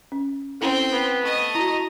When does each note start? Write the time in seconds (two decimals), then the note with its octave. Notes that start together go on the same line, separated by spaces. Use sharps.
0.12 C#4
0.61 C4 C#4 E4 A4
0.93 B3
1.21 A3 D#5
1.55 E4 F#4 A#5